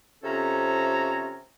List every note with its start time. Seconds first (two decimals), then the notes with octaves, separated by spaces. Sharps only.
0.23 F2 C3 C#4 A4 C#5 A#5